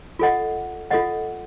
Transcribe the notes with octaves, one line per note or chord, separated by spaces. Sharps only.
F4 A4 D#5 F#5
F4 A4 D#5 F#5